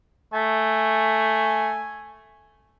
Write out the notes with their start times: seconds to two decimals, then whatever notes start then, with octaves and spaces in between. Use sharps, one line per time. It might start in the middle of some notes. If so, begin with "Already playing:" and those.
0.33 A3 G#5